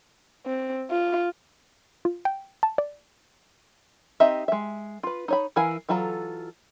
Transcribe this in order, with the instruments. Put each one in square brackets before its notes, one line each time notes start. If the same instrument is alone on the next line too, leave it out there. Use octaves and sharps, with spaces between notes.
[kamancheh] C4
F4
[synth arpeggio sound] F4
G5
A5
D5
[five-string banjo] C4 D#4 G4 D#5 E5
G#3 E5
F4 B4
D#4 C#5 B5
E3 E4 A#4 F5 G#5
E3 F#3 F4 A4 A#5